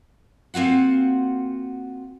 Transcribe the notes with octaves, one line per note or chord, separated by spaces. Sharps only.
A#3 C4 F4 F#4 F#5